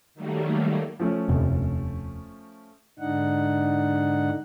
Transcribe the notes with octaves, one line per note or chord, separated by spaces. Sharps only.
D#3 F#3 G3 A3 A#3
F3 A3 C#4
D#1 F2 C3
G#2 D3 D4 D#4 F#5